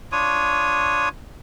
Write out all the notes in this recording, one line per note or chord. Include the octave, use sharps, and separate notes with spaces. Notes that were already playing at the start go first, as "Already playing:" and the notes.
D4 F4 C#5 D#6